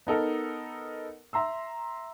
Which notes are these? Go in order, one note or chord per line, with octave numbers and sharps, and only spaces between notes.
B3 D#4 A4 A#4
E5 A#5 C6 E6